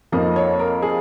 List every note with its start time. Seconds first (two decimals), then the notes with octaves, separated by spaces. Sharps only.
0.12 F2 F3 A#3 D#4 D#5
0.36 C#5
0.59 A#4
0.82 G#4